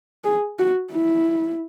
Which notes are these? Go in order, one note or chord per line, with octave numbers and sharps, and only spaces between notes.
G#4
F#4
E4